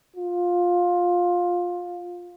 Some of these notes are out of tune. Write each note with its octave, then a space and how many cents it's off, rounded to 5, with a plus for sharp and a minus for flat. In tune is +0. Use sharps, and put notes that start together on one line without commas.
F4 +15